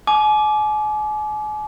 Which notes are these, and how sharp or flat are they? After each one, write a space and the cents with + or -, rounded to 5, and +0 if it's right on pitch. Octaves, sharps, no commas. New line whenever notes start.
G#5 +40 D6 +0